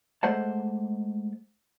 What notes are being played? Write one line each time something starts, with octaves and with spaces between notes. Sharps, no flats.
G#3 A3 C5 F#5 A5